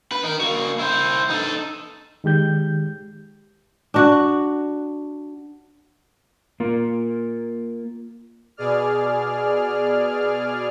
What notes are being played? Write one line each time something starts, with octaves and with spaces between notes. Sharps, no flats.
B4
D#4 A#4
A#3 F#4
E4 C5
D#4 A4
D#3 G#3 G4 G6
D4 F#4
A#3 F4 A#4
B2 G#4 D5 F6